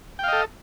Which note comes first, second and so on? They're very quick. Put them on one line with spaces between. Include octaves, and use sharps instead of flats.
G5 F5 D#5 A4